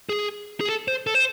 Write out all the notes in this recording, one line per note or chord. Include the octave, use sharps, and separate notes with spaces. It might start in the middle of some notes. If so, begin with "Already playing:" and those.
G#4
G#4
A4
C5
A4
C5